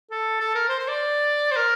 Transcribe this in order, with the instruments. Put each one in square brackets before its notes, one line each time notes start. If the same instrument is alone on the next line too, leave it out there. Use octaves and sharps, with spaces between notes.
[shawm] A4
A4
A#4
C5
C5
D5
C5
A#4